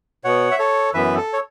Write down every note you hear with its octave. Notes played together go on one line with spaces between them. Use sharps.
B2 B3 C#5 F#5
E5
A4 C#5
F#2 E3 B3 B4 E5
A4
C#5